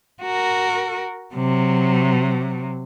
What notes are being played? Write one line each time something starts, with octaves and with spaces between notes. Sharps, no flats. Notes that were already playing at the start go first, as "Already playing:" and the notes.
F#4 A#4
C3 F#3